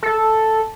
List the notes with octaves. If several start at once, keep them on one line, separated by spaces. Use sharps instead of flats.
A4